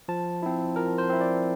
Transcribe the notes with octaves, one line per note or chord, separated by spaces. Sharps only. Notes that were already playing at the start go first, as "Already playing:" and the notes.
F3 A5
C4 E4
F3 A#4
C5
C4 E4
D5